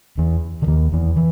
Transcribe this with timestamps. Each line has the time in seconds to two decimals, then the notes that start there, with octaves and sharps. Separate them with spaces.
0.18 E2 E3
0.62 D3
0.67 D#2 D#3
0.92 E2 E3
1.16 E3